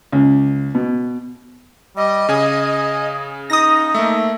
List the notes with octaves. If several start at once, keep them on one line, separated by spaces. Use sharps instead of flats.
C#2
B2
G3 D#5
C#3 G#4 G#5
D#4 D#6 A#6
A3 A#3 E5